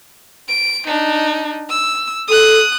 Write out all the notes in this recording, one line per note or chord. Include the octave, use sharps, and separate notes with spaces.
D7
D4 D#4
E6
A4 D#6 F#6